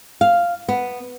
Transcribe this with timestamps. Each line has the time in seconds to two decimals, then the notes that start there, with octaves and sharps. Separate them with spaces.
0.21 F5
0.68 B3